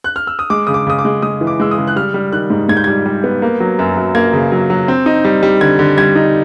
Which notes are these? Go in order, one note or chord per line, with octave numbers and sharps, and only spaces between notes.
F#6
F6
E6
D#6
G#3 D6
C#3 D#6
D6
C#3 D#6
D6
G#3
G#3 D#6
E3
D6
G#3 E6
D#6
C#3
F#6
G3 F6
G3
D#3 F#6
G#2
G#2 G#6
G6
G3 G#6
G3
B3
A#3
F#3
F#2
F#2
A#3 G#6
C#3
F#3
F#3
C4
D#4
G3
G3
D3 G#6
D3
G3 G#6
D#4